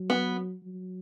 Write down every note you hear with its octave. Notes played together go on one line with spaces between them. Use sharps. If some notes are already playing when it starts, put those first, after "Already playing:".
Already playing: F#3
B3
F#3